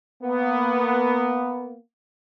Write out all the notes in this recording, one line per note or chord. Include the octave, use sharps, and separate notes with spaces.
A#3 B3